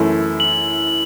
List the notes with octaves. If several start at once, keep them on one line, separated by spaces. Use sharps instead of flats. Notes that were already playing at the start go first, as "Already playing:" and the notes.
Already playing: F#2 E3 A3 E4
F#7